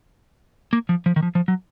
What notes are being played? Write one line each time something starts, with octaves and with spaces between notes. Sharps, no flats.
A#3
F3
F3
D#3
F3
F3
F#3